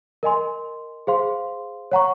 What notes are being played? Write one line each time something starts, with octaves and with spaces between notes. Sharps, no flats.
A#4 D#5 G#5 C6
G#4 C5 F5 C6
C#5 F#5 A#5 C#6